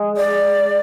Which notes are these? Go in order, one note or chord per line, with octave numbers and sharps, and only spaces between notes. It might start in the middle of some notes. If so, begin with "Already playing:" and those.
Already playing: G#3
D5